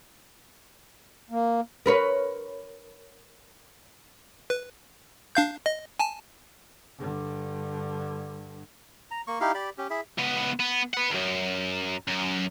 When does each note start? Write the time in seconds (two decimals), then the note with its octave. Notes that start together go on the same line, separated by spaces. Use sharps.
1.30 A#3
1.86 A#4 B4 C#5
4.50 B4
5.35 D4 F5 G6
5.66 D#5
5.99 G#5 A5
6.98 G2 D3
9.11 A#5
9.27 A#3 C#6
9.41 D#4 E4 G4 F5
9.54 G4 D5 B5
9.78 C#4 G4
9.90 E4 G#4 E5
10.19 C#2 B3
10.60 B3
10.94 B4 F#5
11.10 C#2 F#2
12.08 F#2